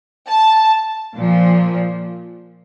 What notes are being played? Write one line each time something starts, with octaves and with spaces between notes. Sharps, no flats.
A5
A#2 F3